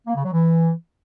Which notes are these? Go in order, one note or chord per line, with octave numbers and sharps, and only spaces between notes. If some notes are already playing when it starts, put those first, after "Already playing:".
A#3
C#3
F#3
E3